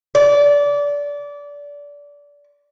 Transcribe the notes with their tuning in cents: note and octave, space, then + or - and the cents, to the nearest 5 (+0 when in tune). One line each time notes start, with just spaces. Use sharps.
D5 -25